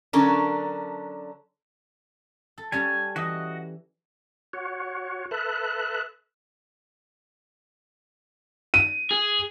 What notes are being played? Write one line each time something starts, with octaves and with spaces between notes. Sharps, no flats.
D3 F#3 C#4 D4 A4 A#4
A4
G3 C#4 A4 G#5
E3 F#4 D#5
F#4 C#5
A4 B4 E5 F#6
D#7
G#4